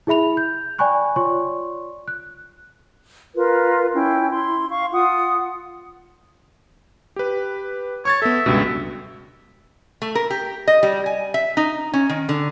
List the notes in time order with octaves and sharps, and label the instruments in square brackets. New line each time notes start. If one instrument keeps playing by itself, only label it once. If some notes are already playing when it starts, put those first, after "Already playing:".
[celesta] E4 G#4 E5 B5 F7
G6
D5 G5 G#5 B5 C#6 F#6
F4 C#5 D5 C6 C#6
F#6
[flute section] F4 A#4 B4
C#4 E4 G5
E4 C6
F5 C#6
F4 F#5 D#6
[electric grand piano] G4 B4
[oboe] C#5 [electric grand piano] C#6 G#6 A6
[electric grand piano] B3 A4 [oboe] E5
[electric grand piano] C#2 G2 B2
[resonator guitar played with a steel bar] A3
A#4
G4
D#5
G3
G#5
E5
D#4
C#4
D#3
D3